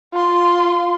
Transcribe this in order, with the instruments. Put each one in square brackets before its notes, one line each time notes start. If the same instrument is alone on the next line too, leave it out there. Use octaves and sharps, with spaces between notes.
[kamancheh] F4 C6